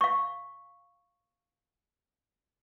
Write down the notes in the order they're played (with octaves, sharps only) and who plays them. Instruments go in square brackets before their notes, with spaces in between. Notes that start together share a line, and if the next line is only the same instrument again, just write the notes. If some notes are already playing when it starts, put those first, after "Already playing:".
[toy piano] F5 C#6